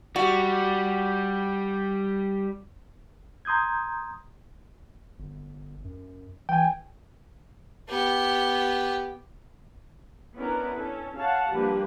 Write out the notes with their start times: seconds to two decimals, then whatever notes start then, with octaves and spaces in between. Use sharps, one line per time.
0.16 G3 F#4
3.45 A#5 C6 D#6 G6 G#6
5.19 G1
5.84 F#2
6.49 E3 G5 G#5
7.88 B3 G4
10.36 B3 C#4 D4 E4 A#4 B4
10.75 C#4 A4
11.18 C#5 F5 F#5 A5
11.52 F3 G3 A#3 D4 G4 B4